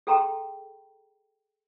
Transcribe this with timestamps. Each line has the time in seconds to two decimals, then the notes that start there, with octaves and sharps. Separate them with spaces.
0.07 G#4 A4 G5 A#5 C6